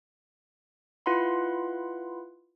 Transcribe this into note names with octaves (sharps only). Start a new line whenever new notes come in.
E4 F4 B4 F#5 B5 C6